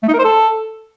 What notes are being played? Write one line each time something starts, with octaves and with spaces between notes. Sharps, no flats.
A3
D#4
A#4
C5
A4